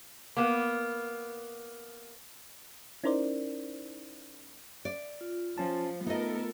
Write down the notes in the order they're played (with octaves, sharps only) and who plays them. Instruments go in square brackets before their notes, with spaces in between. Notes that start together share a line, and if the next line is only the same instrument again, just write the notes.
[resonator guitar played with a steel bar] A#3 B3
[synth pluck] C#4 D#4 E4 A#4 C5 D5
[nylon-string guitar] D5
[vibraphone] F4
[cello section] F3 [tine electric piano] C#4 A5
[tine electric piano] A3 [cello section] B3 A4 A#4 [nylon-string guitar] D#4 D#5